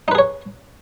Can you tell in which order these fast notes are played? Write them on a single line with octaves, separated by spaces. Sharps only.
D#4 B4 G#4 C#5